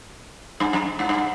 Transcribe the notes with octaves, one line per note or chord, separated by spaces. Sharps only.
G2
F#2
G#2
G2